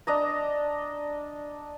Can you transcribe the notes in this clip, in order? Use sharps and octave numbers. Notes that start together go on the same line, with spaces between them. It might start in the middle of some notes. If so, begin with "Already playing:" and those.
D4 D#5 A#5